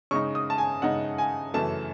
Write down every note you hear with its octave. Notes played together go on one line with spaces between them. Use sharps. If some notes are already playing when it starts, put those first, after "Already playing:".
C#3 G#3 D#4 C#6
D#6
A5
G#5
C#3 G#3 D#4 F#5
G#5
F#2 C#3 E3 A3 A5